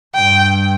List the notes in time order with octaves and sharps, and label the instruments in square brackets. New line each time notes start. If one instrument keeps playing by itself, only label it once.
[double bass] G2 [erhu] G5